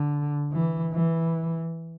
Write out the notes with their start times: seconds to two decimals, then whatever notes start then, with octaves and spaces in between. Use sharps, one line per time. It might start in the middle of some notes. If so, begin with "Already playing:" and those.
Already playing: D3
0.52 E3
0.93 E3